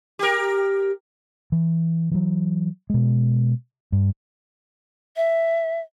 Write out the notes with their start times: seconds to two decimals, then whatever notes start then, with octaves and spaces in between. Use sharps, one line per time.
0.19 G4 A#4
1.52 E3
2.11 E3 F#3
2.90 B2 G#3
3.92 G2
5.16 E5